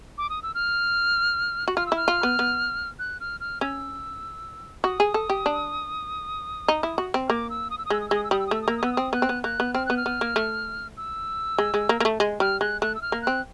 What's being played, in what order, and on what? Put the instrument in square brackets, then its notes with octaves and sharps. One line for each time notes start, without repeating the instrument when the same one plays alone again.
[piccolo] D6
D#6
E6
F6
[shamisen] F#4
[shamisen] F4 [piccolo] F6
[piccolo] E6
[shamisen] E4 [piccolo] F6
[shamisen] F4
B3
B3
[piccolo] F#6
F6
F6
[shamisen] C#4 [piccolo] E6
[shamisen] F#4 [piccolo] D#6
[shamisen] G#4
A4
G4
D4
D#4
E4
F#4
C4
[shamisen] A#3 [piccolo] D6
[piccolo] E6
D#6
E6
D#6
[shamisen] G#3 [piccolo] E6
[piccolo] D#6
E6
[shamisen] G#3 [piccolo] D#6
[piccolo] E6
[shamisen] G3 [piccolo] D#6
[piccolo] E6
D#6
[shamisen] A3 [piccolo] E6
[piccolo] D#6
[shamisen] A#3 [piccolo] E6
[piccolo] D#6
[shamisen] B3 [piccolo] E6
[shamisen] C4 [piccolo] D#6
[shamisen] B3 [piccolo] F#6
[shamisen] C4
B3
[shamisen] A#3 [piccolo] F#6
[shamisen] B3
[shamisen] C4 [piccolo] F6
[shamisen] B3 [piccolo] F#6
[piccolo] F6
[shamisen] B3
A#3
A3
[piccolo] E6
[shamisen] G#3
G#3
A#3
A#3
A3
G#3
[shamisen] G3 [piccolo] F6
[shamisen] G#3 [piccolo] F#6
[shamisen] A3 [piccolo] F#6
[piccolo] E6
F6
[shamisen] A#3
[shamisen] C4 [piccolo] F#6